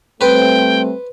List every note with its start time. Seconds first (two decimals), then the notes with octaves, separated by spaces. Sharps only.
0.21 G3 A3 C4 B4 C5 G5